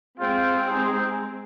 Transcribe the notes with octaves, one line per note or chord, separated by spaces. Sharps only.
G#3 C4 F4 C5 G5
D#4 G#4 C5